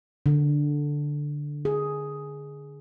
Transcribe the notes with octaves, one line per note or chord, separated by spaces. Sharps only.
D3
G#4